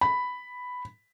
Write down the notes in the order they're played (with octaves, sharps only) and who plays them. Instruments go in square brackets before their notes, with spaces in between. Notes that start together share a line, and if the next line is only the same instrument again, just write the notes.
[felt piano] B5